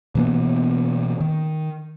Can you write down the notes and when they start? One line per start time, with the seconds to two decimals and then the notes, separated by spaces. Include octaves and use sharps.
0.15 B2 E3 A#3 B3
1.20 D#3